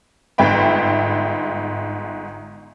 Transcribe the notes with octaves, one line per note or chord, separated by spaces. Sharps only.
G1 G#2 E5 G5 B5